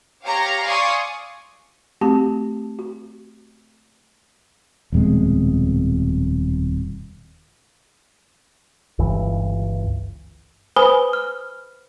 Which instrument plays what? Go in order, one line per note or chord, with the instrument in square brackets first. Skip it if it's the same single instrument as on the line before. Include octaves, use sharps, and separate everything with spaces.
[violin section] G4 C#5 F5 A#5
D5 F5 G#5 C6 C#6 D#6
[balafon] A3 C4 F#4 G4 A5
F#4
[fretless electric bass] D#1 F2 B2 G#3
[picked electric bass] G1 C#2 G2 E3
[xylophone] B4 C5 G#5 B5 D#6 G7
F6